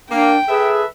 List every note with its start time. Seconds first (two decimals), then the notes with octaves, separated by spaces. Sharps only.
0.11 A#3 D4 G5
0.49 G#4 A4 B4 E5